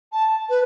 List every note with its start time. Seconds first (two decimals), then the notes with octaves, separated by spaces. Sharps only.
0.12 A5
0.49 B4